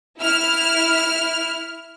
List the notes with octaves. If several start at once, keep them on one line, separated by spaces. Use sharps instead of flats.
E4 F6